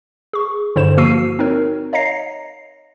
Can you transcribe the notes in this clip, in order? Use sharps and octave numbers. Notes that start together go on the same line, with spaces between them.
G#4 C#6
G2 D3 E4 C5 E7
F3 A#3 F#4 E6 C7 D#7
C4 D#4 A#4 C#5
C#5 D#5 F5 A#5 A#6 C7